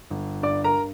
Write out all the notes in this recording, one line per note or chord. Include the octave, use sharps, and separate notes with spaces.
G1
G2 D5 D6
A#4 A#5